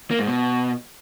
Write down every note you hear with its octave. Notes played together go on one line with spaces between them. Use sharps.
A#3
G#2
B2